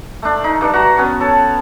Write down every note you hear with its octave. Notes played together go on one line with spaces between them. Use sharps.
A3 D4
D#4
G2 D4 C#6
F#4 A#5
B3 C#4 F#4
A4 C#5 A5